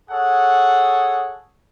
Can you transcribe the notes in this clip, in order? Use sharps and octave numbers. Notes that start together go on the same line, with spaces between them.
G#4 A4 C#5 F#5